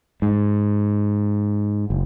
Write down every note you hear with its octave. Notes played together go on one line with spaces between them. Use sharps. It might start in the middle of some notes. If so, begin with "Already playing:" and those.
G#2
F#1